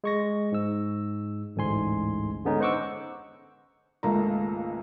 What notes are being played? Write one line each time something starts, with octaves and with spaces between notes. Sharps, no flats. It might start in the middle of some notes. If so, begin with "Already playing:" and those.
G#3 C#6 A#6
G#2 E6
A1 D2 G#2 G#5 C6
D3 G#3 B3 C#4 D#4
C5 D#5 F#5 C#6 D6 E6
G#1 C#2 A3 A#3 A#5